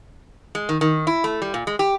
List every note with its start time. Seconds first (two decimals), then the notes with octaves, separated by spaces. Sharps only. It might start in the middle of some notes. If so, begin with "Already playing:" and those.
0.55 G#3
0.69 D#3
0.81 D#3
1.07 E4
1.24 A3
1.42 G3
1.54 A#2
1.67 G#3
1.79 G4